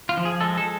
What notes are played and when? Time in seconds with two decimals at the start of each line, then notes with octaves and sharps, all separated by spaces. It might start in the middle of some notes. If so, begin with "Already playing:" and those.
0.09 F4
0.17 F3
0.25 G#4
0.41 G#3 A4
0.58 A4